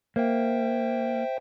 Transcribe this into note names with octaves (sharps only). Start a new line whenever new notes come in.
A#3 C5 E5 G5